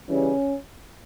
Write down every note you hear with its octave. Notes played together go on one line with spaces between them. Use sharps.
C#3 E3 G3 C#4